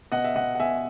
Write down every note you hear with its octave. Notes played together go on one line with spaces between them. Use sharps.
B2 D#5 F#5
E5
B2 D#5 F#5
F#5
B2 E5 G#5